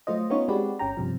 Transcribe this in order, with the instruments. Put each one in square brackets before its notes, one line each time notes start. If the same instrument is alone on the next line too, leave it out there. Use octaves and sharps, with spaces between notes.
[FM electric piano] F#3 A3 F4 C5 D#5
B3 C#4 D#4 F4 C#5
G#3 C4 F#4 G4 B4 D5
G1 C#4 G5 A#5
G2 C3 F3